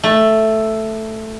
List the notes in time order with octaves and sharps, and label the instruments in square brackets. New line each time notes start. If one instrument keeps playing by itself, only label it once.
[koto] A3